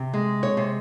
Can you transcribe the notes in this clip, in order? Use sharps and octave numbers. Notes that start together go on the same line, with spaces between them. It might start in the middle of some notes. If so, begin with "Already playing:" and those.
Already playing: C3
G#3
C#5
C3